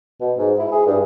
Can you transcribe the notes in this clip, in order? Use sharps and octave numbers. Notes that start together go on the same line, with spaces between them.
B2
G#2
E4
G#4
G2